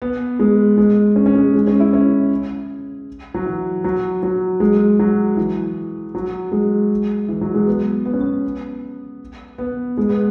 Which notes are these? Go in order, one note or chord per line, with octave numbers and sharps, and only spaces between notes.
B3
G#3
G#3
C#4
C#4
G#3
G#3
C#4
E4
C#4
F#3
E3
F#3
F#3
G#3
F#3
E3
F#3
G#3
E3
F#3
G#3
B3
B3
C#4
B3
B3
G#3
B3